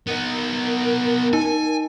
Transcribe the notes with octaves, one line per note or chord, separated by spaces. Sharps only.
B3 D#4 A#4
D#4 G#5